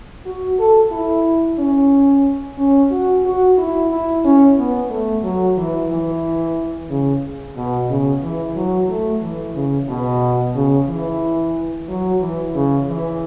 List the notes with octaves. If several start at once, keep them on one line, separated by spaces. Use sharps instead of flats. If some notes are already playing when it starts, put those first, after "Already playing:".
F#4
A4
E4
C#4
C#4
F#4
F#4
E4
E4
C#4
B3
A3
F#3
E3
E3
C#3
B2
C#3
E3
F#3
A3
E3
C#3
B2
C#3
E3
F#3
E3
C#3
E3